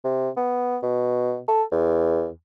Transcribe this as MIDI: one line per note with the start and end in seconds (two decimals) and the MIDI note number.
0.04 0.30 48
0.37 0.77 59
0.83 1.40 47
1.48 1.63 69
1.72 2.29 40